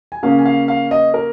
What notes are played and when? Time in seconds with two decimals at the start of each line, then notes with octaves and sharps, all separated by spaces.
0.12 G#5
0.23 C#3 A#3 C#4 F5
0.39 G#5
0.45 F5
0.68 F5
0.91 D#5
1.14 A#4